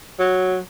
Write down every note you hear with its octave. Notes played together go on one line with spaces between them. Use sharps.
F#3